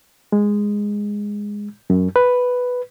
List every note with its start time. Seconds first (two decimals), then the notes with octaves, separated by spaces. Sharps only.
0.32 G#3
1.90 F#2
2.16 B4